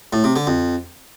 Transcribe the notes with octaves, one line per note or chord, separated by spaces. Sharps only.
A2
C3
D3
F2